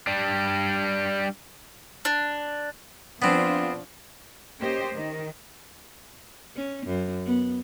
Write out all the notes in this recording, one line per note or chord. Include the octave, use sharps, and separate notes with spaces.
G3 D4
D4
F3 B3 C4 D4 F4
A#3 C#4 G4 C5 D#5
D#3
C#4
F#2
B3